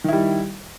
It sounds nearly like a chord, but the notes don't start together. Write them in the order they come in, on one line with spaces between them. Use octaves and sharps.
D#3 E4 G3